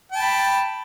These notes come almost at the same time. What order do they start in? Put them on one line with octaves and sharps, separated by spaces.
G5 A5 B5